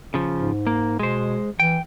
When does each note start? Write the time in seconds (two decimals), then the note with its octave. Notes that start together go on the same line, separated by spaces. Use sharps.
0.14 C#3 F3
0.38 G#2
0.67 A#3
0.99 B2 G#3 C5
1.60 E3 G5